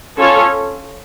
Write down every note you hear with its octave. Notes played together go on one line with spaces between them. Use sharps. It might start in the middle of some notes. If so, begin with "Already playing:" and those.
C#4 F4 A4 C#5